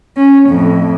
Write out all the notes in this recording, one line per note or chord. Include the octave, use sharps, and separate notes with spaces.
C#4
F2 A2